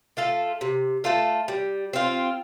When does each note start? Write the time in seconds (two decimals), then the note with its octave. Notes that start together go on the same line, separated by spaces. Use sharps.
0.17 A3 F4 A4
0.61 C3
1.04 A3 F4 A4
1.48 G3
1.93 C4 F4